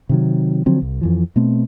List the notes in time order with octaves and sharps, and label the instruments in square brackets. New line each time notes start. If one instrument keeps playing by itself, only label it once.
[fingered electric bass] C3 D#3 F#3
D3 F3 F#3 C4
C2
F2 E3 F3
B2 A3 C4